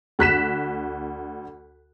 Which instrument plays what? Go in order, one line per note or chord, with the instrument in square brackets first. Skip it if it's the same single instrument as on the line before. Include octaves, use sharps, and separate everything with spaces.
[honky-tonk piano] D2 F#6 B6 E7